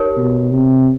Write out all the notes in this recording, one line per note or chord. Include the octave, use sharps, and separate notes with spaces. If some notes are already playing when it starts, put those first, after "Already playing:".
Already playing: D#4 G4 A#4 C#5
B2
C3